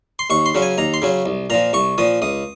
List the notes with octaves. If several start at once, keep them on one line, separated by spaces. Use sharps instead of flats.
C6
D#2 C#6
C6
C#3 F#3 C#4
G#5
D#2 A#5
C6
C#3 F#3 C#4
C2
A#2 F3 A#5
C2 C#6
A#2 F3 D#6
C#2 D#6